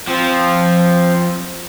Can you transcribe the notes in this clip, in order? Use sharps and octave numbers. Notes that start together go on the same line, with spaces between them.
F3 C4